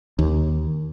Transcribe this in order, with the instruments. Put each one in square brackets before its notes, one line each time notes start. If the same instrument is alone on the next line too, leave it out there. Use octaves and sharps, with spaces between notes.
[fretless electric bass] D#2